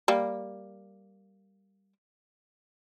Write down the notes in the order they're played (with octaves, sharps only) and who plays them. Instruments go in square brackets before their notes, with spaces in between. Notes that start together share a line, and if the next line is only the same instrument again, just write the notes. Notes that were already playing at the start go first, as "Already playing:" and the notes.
[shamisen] G3 A#3